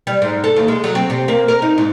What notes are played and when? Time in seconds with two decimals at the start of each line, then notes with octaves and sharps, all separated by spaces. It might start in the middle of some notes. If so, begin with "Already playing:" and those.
0.07 G3
0.22 G#2
0.44 A4
0.56 D#2
0.68 G#3
0.84 F#3
0.95 C4
1.10 C3
1.28 A#3
1.48 A#4
1.62 D#4
1.78 G#2